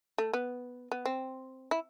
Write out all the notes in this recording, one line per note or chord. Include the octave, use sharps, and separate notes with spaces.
A3
B3
B3
C4
E4